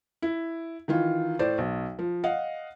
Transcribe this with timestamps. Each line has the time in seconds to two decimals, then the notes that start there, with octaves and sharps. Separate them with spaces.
0.22 E4
0.88 D#3 E3 F4
1.39 A2 C5 D5
1.58 B1
1.99 F3
2.24 D#5 F5 F#5